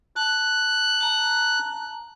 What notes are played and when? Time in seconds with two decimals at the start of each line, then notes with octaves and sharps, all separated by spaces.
0.16 A5 F#6
1.01 A5 A#5